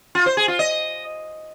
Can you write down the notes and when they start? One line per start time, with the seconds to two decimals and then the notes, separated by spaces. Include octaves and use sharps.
0.15 F4
0.26 C5
0.37 G#4
0.48 F4
0.59 D#5